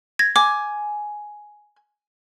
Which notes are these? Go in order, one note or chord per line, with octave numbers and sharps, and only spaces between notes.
G#6 A#6
G#5 D6